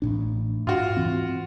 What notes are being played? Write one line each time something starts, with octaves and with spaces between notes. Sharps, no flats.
A1 A2 D4
G#2 F4 F#4
G#2 E3 C4